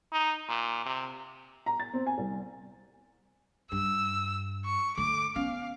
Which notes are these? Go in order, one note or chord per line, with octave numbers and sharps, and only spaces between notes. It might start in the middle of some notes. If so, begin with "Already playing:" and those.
D#4
A#2
C3
A#5
A6
C4
G#5
C2
G2 E6
C#6
D3 A3 D6
B3 C#4 F5